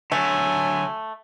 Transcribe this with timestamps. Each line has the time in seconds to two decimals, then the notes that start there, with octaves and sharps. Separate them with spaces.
0.12 D3 F#3 A3 F#4 G#5